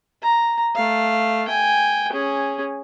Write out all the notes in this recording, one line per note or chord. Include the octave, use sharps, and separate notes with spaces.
A#5
A3 F5
G5 G#5
C#4 G#4